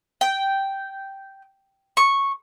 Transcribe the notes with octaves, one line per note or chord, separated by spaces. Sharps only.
G5
C#6